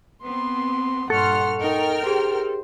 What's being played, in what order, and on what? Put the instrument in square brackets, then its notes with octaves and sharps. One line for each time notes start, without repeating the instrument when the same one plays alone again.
[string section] B3 C4 [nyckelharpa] C6
[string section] G2 A#2 F6 [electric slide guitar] A4 [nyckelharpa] F#5 C6 [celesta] C#6 C#7
[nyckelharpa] D#4 [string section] A#4 G5 F6
[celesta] G4 G#4 [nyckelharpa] C5